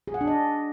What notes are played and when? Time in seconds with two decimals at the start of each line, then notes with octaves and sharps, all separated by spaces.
0.08 G#4
0.14 F#5
0.21 D4
0.27 D#5